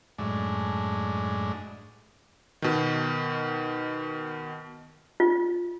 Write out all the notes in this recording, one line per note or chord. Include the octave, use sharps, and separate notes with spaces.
F#2 A2 G#3 D4
B2 D#3
F4